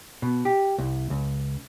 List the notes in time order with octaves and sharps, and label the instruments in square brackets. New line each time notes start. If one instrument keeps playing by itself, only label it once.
[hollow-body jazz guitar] B2
G4
C2
C#2